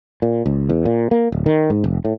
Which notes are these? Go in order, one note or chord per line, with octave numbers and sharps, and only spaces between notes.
A#2
C#2
E2
A#2
A#3
D1
D#3
G#2
F1
A2